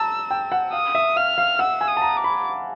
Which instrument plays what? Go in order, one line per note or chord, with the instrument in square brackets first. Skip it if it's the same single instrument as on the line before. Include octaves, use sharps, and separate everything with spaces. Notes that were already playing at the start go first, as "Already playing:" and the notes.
Already playing: [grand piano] A5 A#5 [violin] E6
[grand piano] G5
F#5
[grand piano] F5 [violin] D#6
[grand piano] E5
[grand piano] F5 [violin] F6
[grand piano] F5
[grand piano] F#5 [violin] E6
[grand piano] G#5
[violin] D#6
[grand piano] A5
A#5
[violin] D6
[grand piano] B5